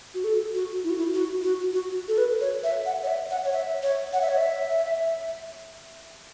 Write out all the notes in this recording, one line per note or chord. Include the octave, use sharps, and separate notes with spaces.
F#4
A4
F#4
E4
F#4
E4
F#4
F#4
F#4
A4
B4
C#5
E5
F#5
C#5
E5
F#5
C#5
E5
C#5
F#5
E5
C#5
E5